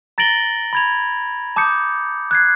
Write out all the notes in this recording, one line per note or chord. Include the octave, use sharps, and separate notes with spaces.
A#5 A6 A#6 D7 F#7 G7
B5 G#6 F7
A5 D6 D#6 G6 C#7
F#6 G#6 C7